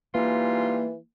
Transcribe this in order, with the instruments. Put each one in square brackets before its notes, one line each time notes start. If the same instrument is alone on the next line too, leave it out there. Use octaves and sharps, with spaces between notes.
[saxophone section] G#2 G3 F4 [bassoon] E3 [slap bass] A#3